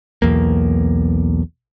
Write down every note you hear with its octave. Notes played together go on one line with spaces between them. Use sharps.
B1 E2 A#3